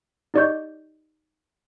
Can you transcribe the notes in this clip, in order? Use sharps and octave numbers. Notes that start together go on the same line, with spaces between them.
D#4 G4 D5 D#5 C#6 G6